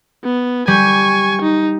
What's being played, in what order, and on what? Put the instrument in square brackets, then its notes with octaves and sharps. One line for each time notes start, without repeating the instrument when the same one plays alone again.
[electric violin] B3
[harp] G3 [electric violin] G#5 C#6
[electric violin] D#4